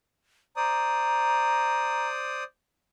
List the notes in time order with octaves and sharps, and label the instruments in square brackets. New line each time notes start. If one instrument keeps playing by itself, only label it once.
[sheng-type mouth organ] C5 D5 D#6 [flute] A#5